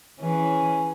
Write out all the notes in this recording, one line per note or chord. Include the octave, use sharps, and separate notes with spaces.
E3 C#4 G#4